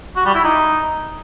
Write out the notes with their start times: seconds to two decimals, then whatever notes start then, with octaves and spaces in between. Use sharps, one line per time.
0.16 F#4
0.25 G3
0.35 E4
0.44 D#4